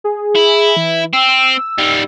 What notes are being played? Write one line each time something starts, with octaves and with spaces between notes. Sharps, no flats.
G#4
E4
E3
C4 E6
D#3 G3